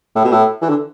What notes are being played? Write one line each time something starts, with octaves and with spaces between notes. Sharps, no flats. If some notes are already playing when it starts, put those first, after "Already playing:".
A2
B2
A2
E3
D3